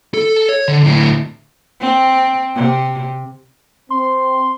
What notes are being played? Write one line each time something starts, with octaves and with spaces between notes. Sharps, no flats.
A4
C#5
D3
D2 A2
C4
C3
C4 C6